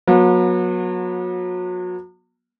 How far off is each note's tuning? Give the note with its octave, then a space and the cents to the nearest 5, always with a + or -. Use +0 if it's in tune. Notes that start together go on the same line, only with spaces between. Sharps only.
F#3 -30 B3 -45